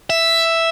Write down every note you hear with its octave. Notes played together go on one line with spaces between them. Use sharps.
E5